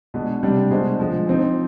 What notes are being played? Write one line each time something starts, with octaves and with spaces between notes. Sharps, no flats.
B2 G#3 D4
C3 G3 D4
B2 G#3 D4 G#4 C5
D3 F3 G#3
F3 C4 D#4